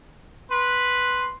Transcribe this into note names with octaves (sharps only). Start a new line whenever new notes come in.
B4 C6